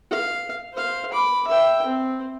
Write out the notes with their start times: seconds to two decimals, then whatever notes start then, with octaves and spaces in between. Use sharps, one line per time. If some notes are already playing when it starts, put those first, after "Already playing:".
0.11 F5
0.73 C5 F5
1.12 B5 D6
1.47 E5 G5
1.86 C4